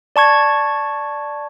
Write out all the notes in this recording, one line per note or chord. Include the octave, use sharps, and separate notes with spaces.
D5 A5 C#6 G#6